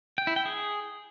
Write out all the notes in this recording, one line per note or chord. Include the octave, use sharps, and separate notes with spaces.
G5
E4
G5
G#4